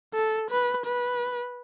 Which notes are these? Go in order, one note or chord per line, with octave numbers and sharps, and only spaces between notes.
A4
B4
B4